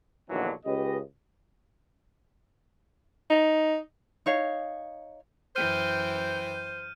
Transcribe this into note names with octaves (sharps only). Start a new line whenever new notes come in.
A#1 D#2 B2 D3 E3 F#3
C#2 C#4 G4 B4 D#5
D#4
D#4 C#5 F5
F#2 E3 C5 G5 F6 G6 D#7